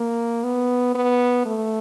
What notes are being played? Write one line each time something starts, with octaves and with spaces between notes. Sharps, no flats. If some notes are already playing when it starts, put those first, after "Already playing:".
Already playing: A#3
B3
B3
A3